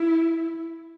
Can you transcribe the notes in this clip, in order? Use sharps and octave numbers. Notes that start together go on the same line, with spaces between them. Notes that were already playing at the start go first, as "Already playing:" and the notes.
Already playing: E4